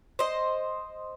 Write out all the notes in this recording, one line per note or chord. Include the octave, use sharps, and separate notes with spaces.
C5 D#5